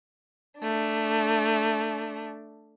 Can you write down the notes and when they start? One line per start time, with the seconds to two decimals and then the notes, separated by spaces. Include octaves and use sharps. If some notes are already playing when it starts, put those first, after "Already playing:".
0.60 A3 D4